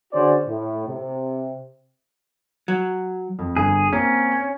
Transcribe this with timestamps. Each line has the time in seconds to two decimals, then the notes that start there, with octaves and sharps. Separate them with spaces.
0.13 D3 C#4 F#4 G#4 C5 D5
0.47 A2
0.88 C3
2.68 F#3
3.39 F2
3.57 G1 G#4
3.93 A#3 C4 C#4